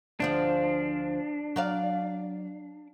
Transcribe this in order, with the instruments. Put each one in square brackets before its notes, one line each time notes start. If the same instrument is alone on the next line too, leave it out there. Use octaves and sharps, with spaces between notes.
[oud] D2 F3 G#4 [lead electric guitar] D4
[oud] F#3 D5 F5